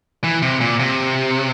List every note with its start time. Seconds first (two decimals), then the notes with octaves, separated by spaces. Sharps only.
0.24 E3
0.43 C3
0.61 A#2
0.80 C3